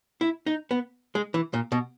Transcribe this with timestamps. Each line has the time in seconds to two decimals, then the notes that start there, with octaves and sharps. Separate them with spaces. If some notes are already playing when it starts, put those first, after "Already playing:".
0.21 E4
0.46 D#4
0.71 B3
1.15 G#3
1.34 E3
1.54 A#2
1.72 B2